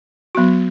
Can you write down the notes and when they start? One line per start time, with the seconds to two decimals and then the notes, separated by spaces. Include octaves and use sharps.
0.35 F#3 B3 F#4